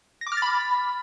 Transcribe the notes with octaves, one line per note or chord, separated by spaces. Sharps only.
A#6
D6
F6
A6
B5